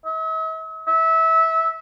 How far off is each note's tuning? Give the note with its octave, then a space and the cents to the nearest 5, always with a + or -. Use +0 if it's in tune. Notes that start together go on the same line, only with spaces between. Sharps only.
E5 -45
E5 -20